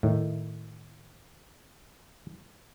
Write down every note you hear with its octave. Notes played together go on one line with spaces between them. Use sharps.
A2 D#3